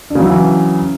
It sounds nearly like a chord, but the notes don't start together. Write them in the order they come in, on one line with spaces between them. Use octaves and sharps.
D4 C#3 F#3 E4 E3